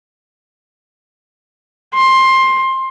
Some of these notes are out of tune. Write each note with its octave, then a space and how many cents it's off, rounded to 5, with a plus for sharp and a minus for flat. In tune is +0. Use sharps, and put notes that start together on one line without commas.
C6 +15